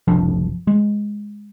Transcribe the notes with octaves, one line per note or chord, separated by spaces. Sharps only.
F#1 C2 F3 D4
G#3